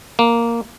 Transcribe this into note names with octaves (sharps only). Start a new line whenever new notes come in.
A#3